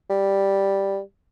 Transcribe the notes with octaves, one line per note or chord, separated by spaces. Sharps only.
G3